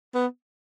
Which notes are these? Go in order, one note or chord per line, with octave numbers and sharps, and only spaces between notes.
B3